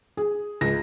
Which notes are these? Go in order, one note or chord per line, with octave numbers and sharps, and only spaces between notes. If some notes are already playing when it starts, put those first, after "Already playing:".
G#4
C#2 A#6